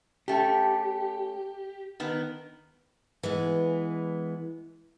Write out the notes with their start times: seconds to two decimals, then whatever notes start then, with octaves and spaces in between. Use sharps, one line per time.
0.28 A3 C#4 G4
2.00 D#3 B3
3.23 E3 G#3 B3